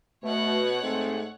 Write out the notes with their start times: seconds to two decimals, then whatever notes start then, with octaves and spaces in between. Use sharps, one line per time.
0.24 B2 A3 C#5 F#5
0.83 G#2 A3 C4